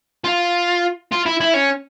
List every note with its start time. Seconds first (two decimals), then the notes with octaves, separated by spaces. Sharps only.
0.24 F4
1.12 F4
1.26 E4
1.40 E4
1.54 C#4